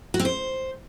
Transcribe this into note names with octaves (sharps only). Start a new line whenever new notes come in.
F#4
C4
C5